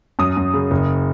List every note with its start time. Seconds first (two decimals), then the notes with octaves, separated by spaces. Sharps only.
0.19 F#2 D#6
0.37 F#2
0.54 C#3
0.71 F#1